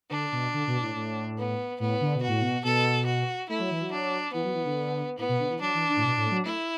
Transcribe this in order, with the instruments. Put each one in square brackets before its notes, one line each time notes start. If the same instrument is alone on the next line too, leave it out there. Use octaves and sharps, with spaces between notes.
[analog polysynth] D3 [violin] D4
[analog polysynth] B2
D3
B2
A2
A2
[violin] B3
[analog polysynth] A2 [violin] B3
[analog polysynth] D3
B2
[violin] F#4
[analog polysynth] A2
B2
[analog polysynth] B2 [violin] A4
[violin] F#4
[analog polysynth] A3 [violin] E4
[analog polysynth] F#3
E3
F#3
[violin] D4
[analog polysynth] E3 [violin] B3
[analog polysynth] F#3
E3
D3
[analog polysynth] A2 [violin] B3
[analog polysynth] B2
D3
E3
[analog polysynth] F#3 [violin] D4
[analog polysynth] E3
D3
A2
B2
A2
A3
F#3
[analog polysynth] A3 [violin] E4